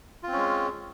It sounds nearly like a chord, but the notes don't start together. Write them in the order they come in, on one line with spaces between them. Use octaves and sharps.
F4 C4 C#4 G#3